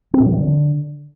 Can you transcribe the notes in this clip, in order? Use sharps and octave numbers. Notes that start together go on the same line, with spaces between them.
C4
A#2
F#3
E3
D3